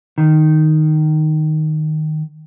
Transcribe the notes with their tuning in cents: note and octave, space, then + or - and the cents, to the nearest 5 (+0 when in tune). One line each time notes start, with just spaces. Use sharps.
D#3 -5